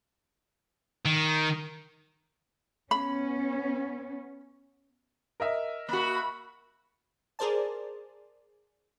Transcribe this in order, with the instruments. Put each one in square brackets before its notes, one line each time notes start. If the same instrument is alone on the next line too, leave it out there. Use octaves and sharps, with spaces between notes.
[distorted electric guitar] D#3
[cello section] B3 C#4 [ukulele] B5
[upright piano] A#4 D#5 E5
[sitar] A#3 F#4 [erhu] B5
[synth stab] G#4 A#4 C5 D5 A5